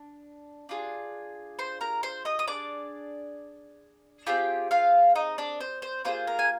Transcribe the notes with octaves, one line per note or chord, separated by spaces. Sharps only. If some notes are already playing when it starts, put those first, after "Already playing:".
Already playing: D4
D4 F4 G#4
C5 C6
A#4 A#5
C5 C6
D#5 D#6
D#6
D4 G#4 D5 D6
C4 F4 G4 G#4 G5
F4 F5
D#4 D#5
D4 D5
C5
C5
A#3 D4 F4 G#4 C5
A#4
G#5